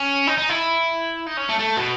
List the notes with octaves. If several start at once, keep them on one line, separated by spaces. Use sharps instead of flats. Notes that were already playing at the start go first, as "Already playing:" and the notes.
Already playing: C#4
D#4
D#4
E4
D#4
C#4
A3
A3
B2